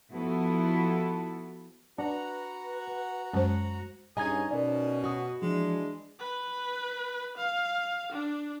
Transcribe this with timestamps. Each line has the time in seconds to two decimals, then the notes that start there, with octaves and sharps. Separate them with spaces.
0.12 F3 B3 E4 F#4 A4
1.98 D4 F#4 B4 F#5 A#5
3.34 F#2 G#3 C5 A5
4.17 G2 C#4 D#4 G#4 D#5 G#5 A#5 G#6
4.51 B2 C#4 A#4 D5
5.04 F#4 C#6 D#6
5.42 E3 F3 G#3 D4
6.19 B4
7.37 F5
8.12 D4